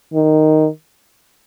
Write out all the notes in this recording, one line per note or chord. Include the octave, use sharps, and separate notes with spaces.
D#3